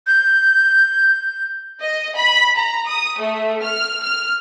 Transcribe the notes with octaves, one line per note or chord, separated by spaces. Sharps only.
G6
D#5
B5
A#5
D#6
A3
F6
F6